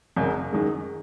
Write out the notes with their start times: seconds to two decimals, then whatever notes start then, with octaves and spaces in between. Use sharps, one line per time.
0.16 G#1 F#2 C#3 G#3
0.53 F#2 D#3 G#3